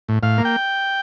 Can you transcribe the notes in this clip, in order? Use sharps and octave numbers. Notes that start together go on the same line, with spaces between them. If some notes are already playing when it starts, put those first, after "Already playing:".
A2
A2 F5
A#3
G5